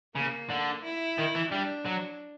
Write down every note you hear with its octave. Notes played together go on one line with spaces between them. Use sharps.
C#3 A#3
D3
E4
D#3
E3
G3 D4
F#3